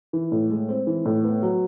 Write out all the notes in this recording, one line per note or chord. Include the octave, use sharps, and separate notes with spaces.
E3
A2
G#3
C4
E3
A2
B3
F#3